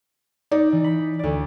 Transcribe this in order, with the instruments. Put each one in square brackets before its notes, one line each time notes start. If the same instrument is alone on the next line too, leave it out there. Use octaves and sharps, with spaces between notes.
[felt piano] D#4 D5
[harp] E3
B5
D2 D5